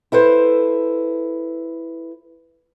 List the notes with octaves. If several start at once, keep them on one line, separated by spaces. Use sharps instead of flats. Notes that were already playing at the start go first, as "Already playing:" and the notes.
E4 A4 B4 C5